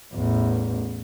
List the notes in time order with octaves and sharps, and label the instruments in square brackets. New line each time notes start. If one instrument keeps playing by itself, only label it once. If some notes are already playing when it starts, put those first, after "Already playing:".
[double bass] A1 E2